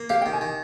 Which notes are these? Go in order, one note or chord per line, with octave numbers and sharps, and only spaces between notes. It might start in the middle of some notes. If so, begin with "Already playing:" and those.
Already playing: A#3
G4 F5
D#3 G5
G#5
D#3